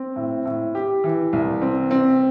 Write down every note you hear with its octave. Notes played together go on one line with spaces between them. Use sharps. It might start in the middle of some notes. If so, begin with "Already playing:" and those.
Already playing: C4
A2
A2
G4
E3
C2
C4
C4